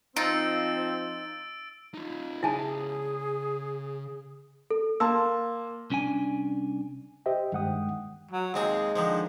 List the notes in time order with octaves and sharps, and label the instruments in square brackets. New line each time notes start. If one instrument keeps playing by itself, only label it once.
[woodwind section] F3 C4 [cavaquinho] D#4 F4 [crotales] E6 A6 D7
[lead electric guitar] D#4 F4
[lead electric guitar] C#3 E5 [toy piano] E4 G#5 A5 [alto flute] G#4
[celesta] A4
[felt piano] A#3 A5 [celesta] C6 E6
[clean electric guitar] C2 C#4 D4 G#5
[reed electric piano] G4 C5 D#5 E5 G5
G2 D#3 G#3 F#5 G5 D#6
[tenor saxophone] F#3
[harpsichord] D#2 C4 G#4 [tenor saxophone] G#3
[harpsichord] D3 D#3 F3